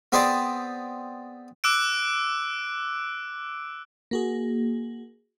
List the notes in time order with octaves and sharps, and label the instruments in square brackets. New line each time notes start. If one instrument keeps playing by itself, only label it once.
[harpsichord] B3 C4 G#4 C5 D5
[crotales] D6 E6 F#6 D7
[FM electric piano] A#3 F#4 G#4